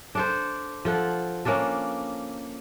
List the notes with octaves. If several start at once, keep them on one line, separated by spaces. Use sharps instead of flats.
D4 A4 C5
F3 A4 F#5
A#3 C#4 D4 A4